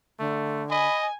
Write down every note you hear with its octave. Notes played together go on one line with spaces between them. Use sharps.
D3 A3
D#5 G#5 B5